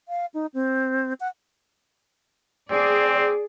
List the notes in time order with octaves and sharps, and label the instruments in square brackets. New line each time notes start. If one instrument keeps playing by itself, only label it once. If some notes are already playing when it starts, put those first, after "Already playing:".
[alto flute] F5
D#4
C4
F#5
[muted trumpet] C4 [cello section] G#4 D5